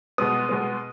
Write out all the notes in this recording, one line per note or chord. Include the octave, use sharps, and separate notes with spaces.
B2 G#3 B3 D#6
B2 G#3 B3